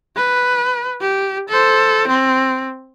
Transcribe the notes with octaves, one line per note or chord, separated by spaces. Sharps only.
B4
G4
A4 C5
C4